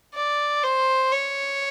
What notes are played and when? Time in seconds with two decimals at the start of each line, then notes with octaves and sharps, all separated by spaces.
0.14 D5
0.63 C5
1.12 C#5